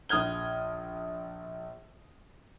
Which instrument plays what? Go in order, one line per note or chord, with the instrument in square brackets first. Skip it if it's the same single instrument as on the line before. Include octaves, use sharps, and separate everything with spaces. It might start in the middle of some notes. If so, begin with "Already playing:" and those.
[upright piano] A#1 D#6 F6 G#6 G7